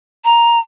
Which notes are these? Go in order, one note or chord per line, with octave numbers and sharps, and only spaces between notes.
A#5